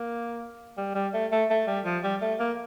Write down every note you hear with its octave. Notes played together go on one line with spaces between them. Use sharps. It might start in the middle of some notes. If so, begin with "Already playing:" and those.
Already playing: A#3
G3
G3
A3
A3
A3
G3
F3
G3
A3
A#3